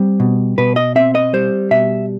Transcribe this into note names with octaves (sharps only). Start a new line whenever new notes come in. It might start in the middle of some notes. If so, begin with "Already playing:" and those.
Already playing: G3 C4
B2
B2 B4
D#5
C4 E5
D#5
G3 C5
B2 E5